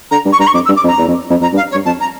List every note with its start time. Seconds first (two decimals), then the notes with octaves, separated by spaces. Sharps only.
0.11 D3 A#5
0.25 G2
0.32 C#6
0.39 G2 A#5
0.47 C#6
0.54 F2 D6
0.65 E6
0.68 G2
0.76 D6
0.84 F2
0.88 A#5
0.98 E2
1.08 F2
1.30 F2
1.41 F2 A#5
1.53 G2
1.56 F5
1.71 C#5
1.75 G2
1.85 F2 A5
2.00 A#5